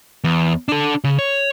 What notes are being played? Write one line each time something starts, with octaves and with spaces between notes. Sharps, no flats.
E2
D4 A4
C#3
C#5